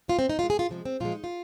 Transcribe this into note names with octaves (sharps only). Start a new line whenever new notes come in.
A#2 G#3 F4
C4
D#4
A#2 G#3 F4
G#4
F4
C3 F3 G#3
C4
A#2 F3 G#3 F4
D#4
F4